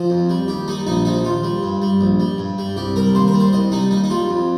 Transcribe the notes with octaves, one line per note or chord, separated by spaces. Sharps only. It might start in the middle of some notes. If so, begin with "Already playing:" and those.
Already playing: F3 D#5
F2
G3
D#2 G4
G3 D#4
A#1 D#4
F3 D#4
D#2 F4
G3
G2
G3
A#1
G3
G2
G3
C2 G4
G3 A#4
D#2 C5
A#4
G3
C5
C2 D#5
G3 D#4
D#2 D#4
D#4
G3 F4
F2